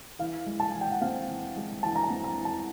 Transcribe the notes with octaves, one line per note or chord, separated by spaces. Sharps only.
E3 F5
G#3
A5
E3 G#5
G5
F#5
C4 F5
E3
G#3
E3 A5
A#5
A5
C4
A#5
E3
A5